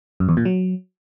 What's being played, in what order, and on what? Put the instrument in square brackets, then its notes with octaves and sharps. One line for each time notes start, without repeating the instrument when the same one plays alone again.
[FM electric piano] F#2
E2
A#2
F#3